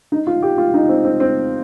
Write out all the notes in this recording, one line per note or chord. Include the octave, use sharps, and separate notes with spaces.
D#4
F4
G4
F4
D#4
C4
C4
C4